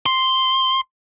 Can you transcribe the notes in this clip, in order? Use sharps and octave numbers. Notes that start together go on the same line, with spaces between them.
C6